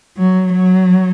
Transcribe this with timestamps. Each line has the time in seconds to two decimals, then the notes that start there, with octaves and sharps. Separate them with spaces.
0.17 F#3
0.53 F#3